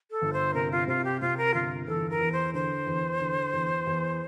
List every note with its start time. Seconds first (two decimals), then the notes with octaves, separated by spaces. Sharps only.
0.11 A4
0.22 G1
0.33 C5
0.54 C3 A#4
0.71 F4
0.87 C3 F4
1.04 G4
1.21 C3 F4
1.37 A#4
1.54 G1 F4
1.88 E2 A4
2.10 A#4
2.21 E2
2.32 C5
2.54 D3 C5
2.87 E2
3.20 D3
3.53 E2
3.87 E2